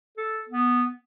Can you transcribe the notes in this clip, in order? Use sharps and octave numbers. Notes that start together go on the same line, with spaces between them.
A4
B3